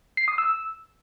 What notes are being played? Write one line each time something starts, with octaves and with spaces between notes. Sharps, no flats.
C7
D#6
E6